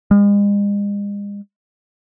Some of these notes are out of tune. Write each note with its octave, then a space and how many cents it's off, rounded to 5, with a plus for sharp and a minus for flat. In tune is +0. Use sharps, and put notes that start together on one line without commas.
G#3 -40